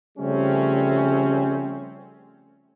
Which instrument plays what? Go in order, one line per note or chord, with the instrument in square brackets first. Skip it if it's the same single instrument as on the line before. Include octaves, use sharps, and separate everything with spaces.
[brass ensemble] C#3 F3 G3 A3 C4 C#4